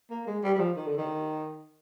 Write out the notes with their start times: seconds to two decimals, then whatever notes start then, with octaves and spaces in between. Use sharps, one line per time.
0.11 A#3
0.27 G#3
0.43 G3
0.54 G3
0.59 F3
0.76 D#3
0.87 D3
0.98 D#3